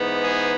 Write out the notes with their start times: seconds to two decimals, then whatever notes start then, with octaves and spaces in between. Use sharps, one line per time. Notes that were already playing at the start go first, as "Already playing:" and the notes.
Already playing: G#2 E3 B3 D#4
0.23 G#4